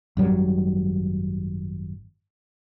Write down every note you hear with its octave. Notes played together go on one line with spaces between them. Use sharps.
G#1 F#2 F#3 G3